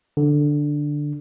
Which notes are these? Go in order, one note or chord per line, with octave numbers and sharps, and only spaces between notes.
D3